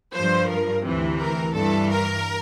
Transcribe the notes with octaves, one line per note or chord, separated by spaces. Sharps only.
G2 F3 C5
A#4
D2 C3 E3
A#4
G2 E3 A4
A#4